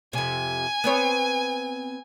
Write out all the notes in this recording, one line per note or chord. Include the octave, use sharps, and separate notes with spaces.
F2 C3 G#5
B3 C4 C#5